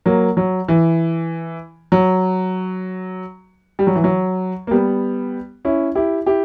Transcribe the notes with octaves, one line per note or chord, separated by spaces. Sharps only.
F#3 A#3
F#3
E3
F#3
G3
F#3
E3
F#3
A#3
G3 B3
C#4 E4
E4 G4
E4 G4